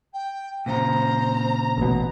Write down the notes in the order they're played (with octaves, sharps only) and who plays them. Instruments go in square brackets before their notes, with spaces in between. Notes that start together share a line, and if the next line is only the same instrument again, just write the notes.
[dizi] G5
[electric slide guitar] A#2 C#3 [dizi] C5 [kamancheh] A#5
[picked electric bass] A1 B2